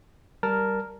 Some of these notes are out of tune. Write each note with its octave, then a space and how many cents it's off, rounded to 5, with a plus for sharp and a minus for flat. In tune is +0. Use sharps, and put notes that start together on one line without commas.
G3 -10 A#4 +0 A5 +0